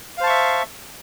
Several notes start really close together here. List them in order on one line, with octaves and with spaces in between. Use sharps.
F5 C5 A5 C#6 E5